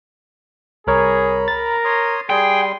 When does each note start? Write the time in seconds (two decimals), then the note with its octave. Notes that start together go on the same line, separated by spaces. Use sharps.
0.87 C2 G#4 A#4 C#5 A#5 B5
1.48 A#4 A6
1.85 C#5 C6 D#6
2.30 G3 G#4 G5 C6